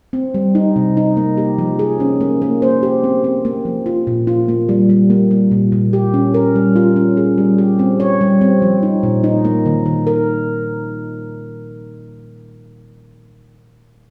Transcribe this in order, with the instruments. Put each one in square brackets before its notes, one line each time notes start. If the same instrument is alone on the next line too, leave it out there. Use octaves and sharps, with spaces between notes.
[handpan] C4
G3
D#4
C3
D#4
A#3
G4
F3
G#4
C#4
A#3
A#3
C5
G4
C4
C4
A#3
F3
F4
A#2
F4
A#3
G3
G3
A#3
G3
A#2
A#2
G4
C#4
A#4
G3
F4
C#4
G#4
G3
G4
C4
C#5
G3
C4
F3
D#4
A#2
D#4
A#3
D#3
D#3
A#4